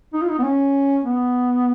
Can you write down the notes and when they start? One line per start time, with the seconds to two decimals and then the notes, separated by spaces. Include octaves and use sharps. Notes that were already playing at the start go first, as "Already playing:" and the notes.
0.13 D#4
0.22 F4
0.30 D#4
0.39 B3
0.43 C#4
1.04 B3